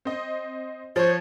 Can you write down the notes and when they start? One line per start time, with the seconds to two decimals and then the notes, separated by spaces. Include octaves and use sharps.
0.05 C4 D#5
0.96 F3 C5 C#5